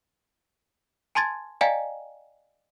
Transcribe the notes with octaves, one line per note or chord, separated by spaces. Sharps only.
G#5 A5 C6 G#6 A6
D5 D#5 F5 G5 G#5 A#5